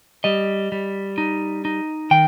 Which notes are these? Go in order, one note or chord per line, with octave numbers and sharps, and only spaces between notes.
G3 D#5
G3
D#4
D#4
D#3 G5